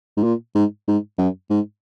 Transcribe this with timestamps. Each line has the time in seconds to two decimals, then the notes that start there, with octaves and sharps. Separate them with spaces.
0.17 G#2
0.24 A#2
0.55 G#2
0.88 G#2
1.18 F#2
1.50 G#2